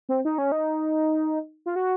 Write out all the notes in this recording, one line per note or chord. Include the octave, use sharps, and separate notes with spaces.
C4
D#4
C#4
D#4
F4
F#4